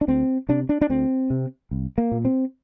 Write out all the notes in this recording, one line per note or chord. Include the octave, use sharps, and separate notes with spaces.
D4
D2 C4
C3 D4
D4
D4
D2 C4
C3
C2
A#3
A#2
C4